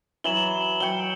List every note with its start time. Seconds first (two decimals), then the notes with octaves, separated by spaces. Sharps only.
0.24 E3 F#3 E7 F#7 G7
0.80 F#3 G5 C#7 G7